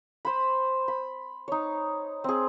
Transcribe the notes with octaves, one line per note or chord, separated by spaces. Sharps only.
C5 B5
B5
D#4 C#5
C4 G#4